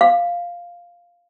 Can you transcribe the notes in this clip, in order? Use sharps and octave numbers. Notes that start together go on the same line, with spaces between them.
F5